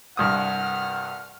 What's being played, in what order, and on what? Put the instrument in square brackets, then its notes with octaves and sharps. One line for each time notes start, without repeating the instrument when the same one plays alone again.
[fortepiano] C2 G2 D#6 [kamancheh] F#5 F6